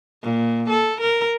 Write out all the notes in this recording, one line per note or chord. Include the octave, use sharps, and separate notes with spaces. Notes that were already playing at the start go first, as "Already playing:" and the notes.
A#2
A4
A#4